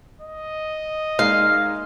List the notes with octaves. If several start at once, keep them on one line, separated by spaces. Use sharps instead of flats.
D#5
G#3 A#3 D#4 F5